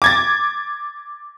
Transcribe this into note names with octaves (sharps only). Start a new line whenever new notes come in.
D6 G#6 A6